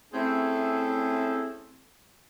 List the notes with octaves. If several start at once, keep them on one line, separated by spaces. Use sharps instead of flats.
A3 C4 C#4 E4 G#4 A4